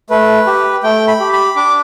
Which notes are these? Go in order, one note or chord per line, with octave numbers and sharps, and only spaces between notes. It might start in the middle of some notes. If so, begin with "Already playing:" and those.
A3 B4
G4
A3 G5
B5
G4
B5
D4 D6